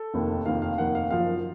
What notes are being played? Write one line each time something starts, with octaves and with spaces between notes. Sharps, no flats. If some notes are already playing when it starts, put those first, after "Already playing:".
Already playing: A4
F1 D#2 D#3
F1 D#2 D#3 F5
F5
F1 D#2 D#3 F#5
F5
F#1 F#2 F3 F5